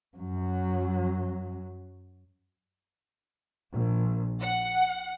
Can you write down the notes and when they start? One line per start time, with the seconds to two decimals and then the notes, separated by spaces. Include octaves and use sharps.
0.17 F#2 F#3
3.74 A#1
4.41 F#5